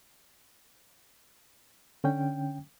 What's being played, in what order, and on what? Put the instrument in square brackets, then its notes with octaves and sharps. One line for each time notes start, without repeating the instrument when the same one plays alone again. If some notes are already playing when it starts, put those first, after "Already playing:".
[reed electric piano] D3 C#4 G5